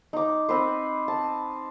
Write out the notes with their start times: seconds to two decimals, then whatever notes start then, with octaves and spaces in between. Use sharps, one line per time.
0.13 D#4 D6
0.49 C4 B4 C5
1.08 A5